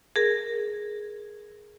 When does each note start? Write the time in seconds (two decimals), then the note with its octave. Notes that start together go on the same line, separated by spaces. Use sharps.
0.16 G#4 A#4